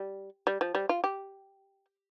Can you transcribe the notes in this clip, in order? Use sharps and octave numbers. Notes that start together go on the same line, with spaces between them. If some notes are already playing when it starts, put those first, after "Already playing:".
Already playing: G3
G3
F3
G3
F4
G4